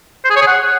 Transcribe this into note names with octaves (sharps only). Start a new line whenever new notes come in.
C5
G#4
C#5
G#4
F#5